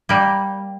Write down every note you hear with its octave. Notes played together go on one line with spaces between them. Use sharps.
G3 A#3